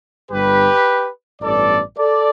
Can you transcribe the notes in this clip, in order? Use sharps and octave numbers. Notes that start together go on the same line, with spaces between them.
G1 G2 G3 G4 B4
A1 G2 E3 B3 A4 D5
A4 D5